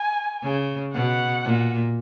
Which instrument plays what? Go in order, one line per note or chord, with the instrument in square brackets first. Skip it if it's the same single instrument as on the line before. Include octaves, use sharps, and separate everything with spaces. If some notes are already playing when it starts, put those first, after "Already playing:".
Already playing: [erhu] G#5
[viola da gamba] C#3
[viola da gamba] B2 [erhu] F#5
[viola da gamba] A#2